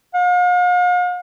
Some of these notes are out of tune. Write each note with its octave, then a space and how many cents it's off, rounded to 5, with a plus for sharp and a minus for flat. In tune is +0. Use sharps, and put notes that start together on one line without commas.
F5 +45